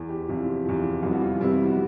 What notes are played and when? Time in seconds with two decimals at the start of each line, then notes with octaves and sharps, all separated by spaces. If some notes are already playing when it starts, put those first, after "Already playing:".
Already playing: E2
0.09 G4
0.28 E2 C3 F3
0.65 E2 C3 F3
1.02 F2 C3 E3 G3 B3 F#4
1.13 F#4
1.22 F4
1.40 F2 C3 E3 G3 B3 E4
1.53 E4
1.66 F#4